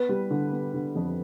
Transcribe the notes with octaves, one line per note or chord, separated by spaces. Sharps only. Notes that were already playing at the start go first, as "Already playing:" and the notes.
Already playing: B3 B4
G3
D3
B3
D3
F2